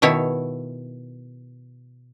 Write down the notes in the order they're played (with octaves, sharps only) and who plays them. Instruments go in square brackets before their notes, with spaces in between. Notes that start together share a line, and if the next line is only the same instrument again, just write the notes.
[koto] B2 D#3 E4 C#5